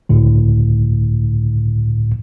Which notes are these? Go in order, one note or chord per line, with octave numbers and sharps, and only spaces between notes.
C#2 A2 D3